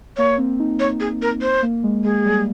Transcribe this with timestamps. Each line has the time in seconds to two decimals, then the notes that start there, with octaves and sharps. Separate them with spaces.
0.17 A#3 C#5
0.38 C4
0.59 D#4
0.80 D#4 C#5
1.00 G#4
1.22 A#4
1.42 C5
1.62 A#3
1.84 G#3
2.04 G#3 G#4
2.25 G3